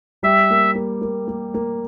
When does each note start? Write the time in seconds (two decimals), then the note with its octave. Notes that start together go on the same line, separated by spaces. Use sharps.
0.23 G3 E5
0.50 A#3
0.75 A#3
1.02 A#3
1.28 A#3
1.54 A#3